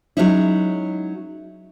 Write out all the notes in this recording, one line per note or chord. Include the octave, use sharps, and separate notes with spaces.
F#3 G#3 C#4 D#4 E4